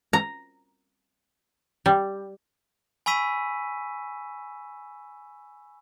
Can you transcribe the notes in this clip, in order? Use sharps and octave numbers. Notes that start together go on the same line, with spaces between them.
A#5
G3
G#5 B5 C#6 E6 B6 D#7